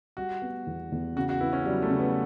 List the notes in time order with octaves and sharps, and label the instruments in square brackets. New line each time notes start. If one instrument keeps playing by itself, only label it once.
[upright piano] G3 [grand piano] F#4
[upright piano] B3
E2
E2
[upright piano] C#3 [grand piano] F#4
[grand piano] F#4
[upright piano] B3 [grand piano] E4
[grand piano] C#4
[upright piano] F#3 [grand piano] G3
[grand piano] A3
[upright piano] C#3
[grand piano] B3